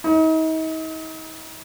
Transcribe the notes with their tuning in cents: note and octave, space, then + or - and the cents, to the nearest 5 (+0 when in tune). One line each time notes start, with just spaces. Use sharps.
D#4 +40